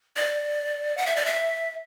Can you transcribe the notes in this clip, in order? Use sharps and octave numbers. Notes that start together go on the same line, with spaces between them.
D5
F#5
E5
D5
E5